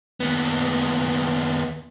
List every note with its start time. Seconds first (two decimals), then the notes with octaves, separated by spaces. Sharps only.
0.20 D#2 B3